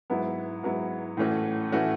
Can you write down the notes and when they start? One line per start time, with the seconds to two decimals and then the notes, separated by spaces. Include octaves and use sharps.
0.10 G#2 F#3 B3 E4
0.63 G#2 F#3 B3 E4
1.17 A2 E3 A3 C#4 F#4
1.72 A2 E3 A3 C#4 F#4